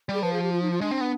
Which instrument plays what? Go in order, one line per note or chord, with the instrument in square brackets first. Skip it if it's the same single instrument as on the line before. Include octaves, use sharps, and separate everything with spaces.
[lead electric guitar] G3 [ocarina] G#4
[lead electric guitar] F3 [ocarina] B4
[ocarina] G#4
G4
F4
D#4
F4
[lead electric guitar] G#3 [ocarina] D4
[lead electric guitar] C4
B3